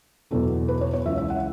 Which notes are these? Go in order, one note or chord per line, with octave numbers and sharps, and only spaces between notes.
E2 B2 F#3 A4
B4
C#5
C#5
C#2 C#3 E3 E5
E5
F#5